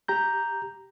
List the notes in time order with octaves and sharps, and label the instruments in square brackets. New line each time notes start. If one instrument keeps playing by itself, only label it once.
[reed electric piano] G4 A#5 G6